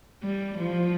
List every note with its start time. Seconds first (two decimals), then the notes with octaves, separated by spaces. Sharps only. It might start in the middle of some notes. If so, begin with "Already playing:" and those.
0.23 G3
0.58 F3